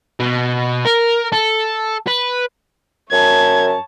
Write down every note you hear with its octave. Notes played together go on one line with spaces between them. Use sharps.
B2
A#4
A4
B4
F#2 C#5 A5 G#6